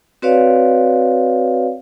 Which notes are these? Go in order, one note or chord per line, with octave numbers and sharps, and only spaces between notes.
C4 F#4 B4 C#5 D5 F5